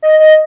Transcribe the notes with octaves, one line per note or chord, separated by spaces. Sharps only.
D#5
D#5